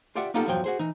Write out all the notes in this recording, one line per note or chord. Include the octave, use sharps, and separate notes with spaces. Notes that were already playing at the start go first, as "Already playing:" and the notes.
F4 G4 D5 E5 F#5
A#3 B3 D#4 F4 G4 A4
E2 G2 F3 F#3 G5
F#4 G#4 C5
E3 D#4